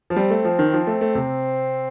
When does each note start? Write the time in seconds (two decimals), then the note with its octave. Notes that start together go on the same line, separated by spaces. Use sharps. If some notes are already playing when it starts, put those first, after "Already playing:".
0.10 F3
0.16 G3 C4
0.30 A3
0.45 F3
0.59 D#3
0.73 F3
0.87 A3
1.01 A3
1.15 C3